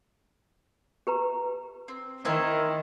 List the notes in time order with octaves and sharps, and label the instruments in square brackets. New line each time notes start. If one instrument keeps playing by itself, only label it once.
[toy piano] G4 B4 A#5
[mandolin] C4
[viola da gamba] D#3 [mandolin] E4 A#4 C5